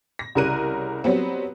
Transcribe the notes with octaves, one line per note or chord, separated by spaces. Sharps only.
A#6
C2 C#3 G3 A#4 F#6 D#7
F#3 G3 B3 C4